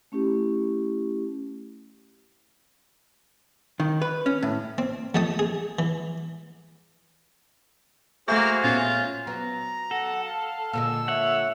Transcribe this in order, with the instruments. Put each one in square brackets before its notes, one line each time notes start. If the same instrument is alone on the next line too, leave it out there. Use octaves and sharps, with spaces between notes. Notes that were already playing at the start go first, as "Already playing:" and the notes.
[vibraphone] A3 C#4 E4 G4
[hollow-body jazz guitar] D#3
B4
C#4
A2
[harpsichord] C4
F2 A3 G5 A5 D#6
G#4
E3
[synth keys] A3 A4 E5 [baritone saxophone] A#3 [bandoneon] F#4 G#4 C5
[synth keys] A#2 B3 C#4 [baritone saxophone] F4
[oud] F#3 B3 [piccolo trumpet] A#5
[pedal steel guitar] A4 [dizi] F#5
[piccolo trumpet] F5 [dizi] A5
[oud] A#2 D3 G#3 [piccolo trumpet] E6
[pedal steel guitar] C#5 F#5 [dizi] E5